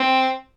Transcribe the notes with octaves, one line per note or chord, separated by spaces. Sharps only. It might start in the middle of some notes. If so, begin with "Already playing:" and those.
Already playing: C4